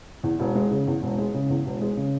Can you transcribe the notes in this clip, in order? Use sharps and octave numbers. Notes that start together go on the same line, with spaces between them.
E2
E1
G#3
C#3
E2
E1
G#3
C#3
E2
E1
G#3
C#3